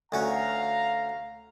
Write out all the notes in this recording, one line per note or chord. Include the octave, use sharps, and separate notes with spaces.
D2 C#4 F#4 F5 A#5